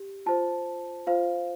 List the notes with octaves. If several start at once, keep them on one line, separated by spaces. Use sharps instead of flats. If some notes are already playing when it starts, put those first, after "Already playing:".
Already playing: G4
F4 C5 A5
F4 C5 F5